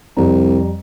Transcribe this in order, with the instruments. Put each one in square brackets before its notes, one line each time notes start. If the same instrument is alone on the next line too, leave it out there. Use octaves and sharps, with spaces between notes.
[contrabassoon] C2 [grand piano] F2 G3 A#5